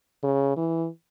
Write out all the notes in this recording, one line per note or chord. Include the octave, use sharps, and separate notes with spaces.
C#3
E3